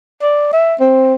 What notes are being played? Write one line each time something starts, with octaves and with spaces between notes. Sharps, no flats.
D5
E5
C4